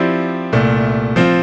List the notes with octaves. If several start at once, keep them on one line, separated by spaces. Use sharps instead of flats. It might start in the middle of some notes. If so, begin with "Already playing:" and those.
Already playing: F3 C4 E4 G4 D5
C2 A#2 A3
F3 C4 F4